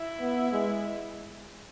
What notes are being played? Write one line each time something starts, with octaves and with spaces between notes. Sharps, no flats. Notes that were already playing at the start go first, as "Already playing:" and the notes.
Already playing: E4
B3
G#3